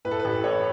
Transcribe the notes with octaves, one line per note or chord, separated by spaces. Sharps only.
A2 B4
A4
B4
A1
A2 C#5